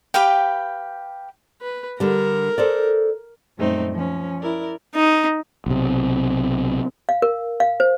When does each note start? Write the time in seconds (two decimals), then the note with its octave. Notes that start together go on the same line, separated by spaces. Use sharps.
0.14 G4 B4 F5 G5
1.62 B4
2.00 D3 G3 A#4
2.58 A4 C5 D5
3.58 F#2 A#2 G3 A3 C4 D#4
3.93 F3 C#4
4.40 E4 A#4 D5
4.95 D#4
5.66 B1 C3
7.09 F5
7.22 A#4
7.60 F5
7.80 C5